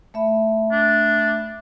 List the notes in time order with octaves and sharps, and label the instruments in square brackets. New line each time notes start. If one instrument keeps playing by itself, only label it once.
[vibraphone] A3 E5 B5
[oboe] D4